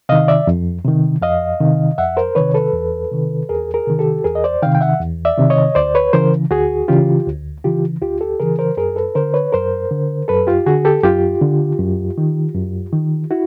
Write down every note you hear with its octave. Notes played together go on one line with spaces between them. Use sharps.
C3 D#3 D#5 F5
D5 E5
F2
C3 D#3
F2 D#5 F5
C3 D#3
F2 E5 F#5
A#4 C5
C3 D#3 B4 C#5
A4 B4
E2
C3 D#3
E2 G#4 A#4
G#4 A#4
C3 D#3
G4 A4
E2 G#4 A#4
D#5
C5 D5
C3 D#3 F5 G5
G5
E5 F#5
E2
D5 E5
C3 D#3
C#5 D#5
D2 C5 D5
B4 C#5
C#3 E3 A#4 C5
D2 F#4 G#4
C#3 E3 F4 G4
D2
C#3 E3 F4 G4
D2 F4 G4
G4 A4
C#3 E3 G#4 A#4
A#4 C5
F#2 G#4 A#4
A4 B4
D3 A#4 C5
B4 C#5
F#2 A#4 C5
D3
F#2 A4 B4
F4 G4
D3 F#4 G#4
G4 A4
F#2 F4 G4
D3
F#2
D#3
F#2
D#3
E4 F#4